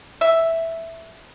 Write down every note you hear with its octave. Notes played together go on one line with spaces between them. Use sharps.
E5